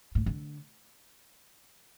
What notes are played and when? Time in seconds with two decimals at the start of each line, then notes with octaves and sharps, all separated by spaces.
0.15 A2
0.26 D3